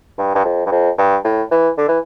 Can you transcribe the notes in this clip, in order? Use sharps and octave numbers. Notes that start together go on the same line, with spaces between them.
G2
G2
F2
G2
F2
G2
A2
E3
D3
E3